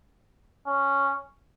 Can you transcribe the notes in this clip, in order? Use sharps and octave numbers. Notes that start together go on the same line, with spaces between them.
C#4